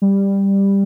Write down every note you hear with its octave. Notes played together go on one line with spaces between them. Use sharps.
G3